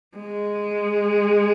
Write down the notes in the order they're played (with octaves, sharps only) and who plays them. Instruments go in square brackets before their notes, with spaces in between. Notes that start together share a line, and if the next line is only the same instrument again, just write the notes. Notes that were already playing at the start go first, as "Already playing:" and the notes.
[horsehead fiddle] G#3